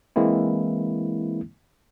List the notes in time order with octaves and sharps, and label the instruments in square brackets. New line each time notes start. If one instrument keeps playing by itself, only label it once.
[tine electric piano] E3 G#3 A#3 C4 E4